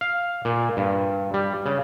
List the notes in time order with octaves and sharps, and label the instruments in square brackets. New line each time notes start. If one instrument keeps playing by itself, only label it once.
[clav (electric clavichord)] F5
A#2
G2
G3
C#3